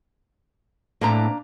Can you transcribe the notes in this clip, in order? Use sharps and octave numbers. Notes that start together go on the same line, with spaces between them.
A2 A#3 C4 D4 A#5